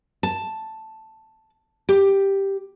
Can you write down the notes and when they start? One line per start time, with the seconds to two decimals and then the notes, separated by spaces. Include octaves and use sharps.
0.23 A5
1.89 G4